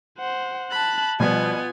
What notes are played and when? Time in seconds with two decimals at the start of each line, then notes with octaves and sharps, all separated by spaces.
0.18 C5 F#5
0.71 A5 B5 F#6
1.20 B2 F3 G3 B3 F4 G#5